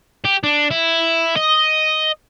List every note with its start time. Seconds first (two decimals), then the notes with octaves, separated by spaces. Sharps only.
0.25 G4
0.44 D4
0.71 E4
1.36 D#5